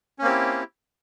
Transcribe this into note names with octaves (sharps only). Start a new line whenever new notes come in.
A#3 C4 C#4 E4 G4